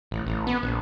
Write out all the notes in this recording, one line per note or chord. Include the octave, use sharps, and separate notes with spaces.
A1
A1
B3
A#1